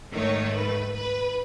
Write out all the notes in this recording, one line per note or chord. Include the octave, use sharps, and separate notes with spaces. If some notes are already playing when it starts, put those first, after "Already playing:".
G#2 D#3 A3 C#5
B4
B4